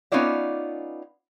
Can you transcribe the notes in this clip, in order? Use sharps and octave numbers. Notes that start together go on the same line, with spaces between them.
B3 C#4 D#4 F4 D5 E5